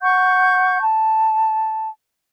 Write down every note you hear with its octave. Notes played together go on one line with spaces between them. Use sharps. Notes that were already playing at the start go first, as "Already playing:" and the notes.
F#5 C#6 G6
A5